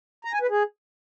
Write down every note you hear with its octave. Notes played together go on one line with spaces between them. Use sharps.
A#5
G#5
B4
G#4